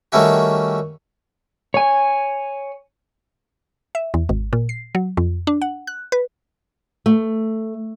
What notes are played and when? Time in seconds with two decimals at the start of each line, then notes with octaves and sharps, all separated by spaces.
0.12 D#3 G3 A3 C#4 E4 F#4
1.74 C#5 G#5
3.95 E5
4.14 E2
4.29 G#1
4.53 A#2
4.69 C7
4.95 F#3
5.17 F2
5.47 D4
5.62 F#5
5.87 F#6
6.12 B4
7.06 A3